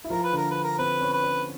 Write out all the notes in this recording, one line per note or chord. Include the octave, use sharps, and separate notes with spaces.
E4
F3 F4 A#4
B4
D3 D4 A#4
B4
A#4
C4 B4
C#4
B4
C#4